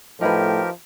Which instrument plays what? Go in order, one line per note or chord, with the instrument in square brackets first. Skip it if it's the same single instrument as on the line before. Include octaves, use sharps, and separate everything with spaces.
[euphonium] A2 [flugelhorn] F3 [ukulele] D#4 E4 B4 [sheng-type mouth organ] G4 A#4